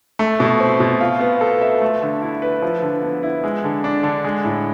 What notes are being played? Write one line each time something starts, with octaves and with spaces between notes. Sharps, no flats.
A3
B2
C4
B2
F4
B3
A4
E5
A3
D3
E4
B4
F3
D3
B3
E4
G#3
D3
D4
D3
G#3
A2